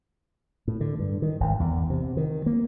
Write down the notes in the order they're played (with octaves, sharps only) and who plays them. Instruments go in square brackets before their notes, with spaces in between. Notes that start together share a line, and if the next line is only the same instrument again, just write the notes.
[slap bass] A2
D3
G2
D#3
G#1
E2
C3
D#3
A#3